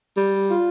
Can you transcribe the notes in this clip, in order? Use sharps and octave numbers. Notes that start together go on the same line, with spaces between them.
G3
F4